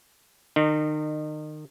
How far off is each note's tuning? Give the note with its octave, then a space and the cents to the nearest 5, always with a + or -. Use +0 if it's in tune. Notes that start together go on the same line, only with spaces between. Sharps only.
D#3 -30 D#4 -30